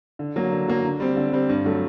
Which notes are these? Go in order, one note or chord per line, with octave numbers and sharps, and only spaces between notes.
D3
F#3 A#3
D3
F#3 A#3
D3
G3 C4
D3
G3 C4
G2
D3 F#3 A3